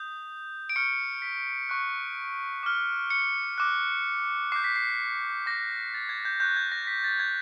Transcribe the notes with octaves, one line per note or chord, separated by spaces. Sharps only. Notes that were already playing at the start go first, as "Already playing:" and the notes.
Already playing: D#6 G6
D7
C#6 F6 C#7
B6
C#6 F#6
D6 F6
C#7
D6 F#6
D6 G6 C7
B6
C7
D6 G6 A#6
A6
G#6
G6
C#6 F#6 G6
G#6
A#6
B6
A6
G#6